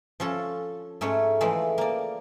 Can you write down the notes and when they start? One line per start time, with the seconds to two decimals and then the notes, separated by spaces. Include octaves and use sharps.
0.20 F3 C#4 A4
1.01 G#2 A3 C#4 C#5
1.41 E3 F3 G#3 A3
1.78 A#3 D5